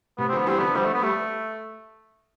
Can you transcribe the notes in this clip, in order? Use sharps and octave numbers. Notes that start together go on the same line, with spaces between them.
A2 C3 B3
D3 F3 C4
B3
E3 G3 C4
D3 F3 B3
D3 F3 G3
A3
B3
G3 A3